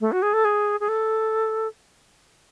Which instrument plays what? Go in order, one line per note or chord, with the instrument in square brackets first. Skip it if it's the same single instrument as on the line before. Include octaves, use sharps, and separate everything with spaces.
[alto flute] A3
F#4
G#4
A4
G#4
G#4
A4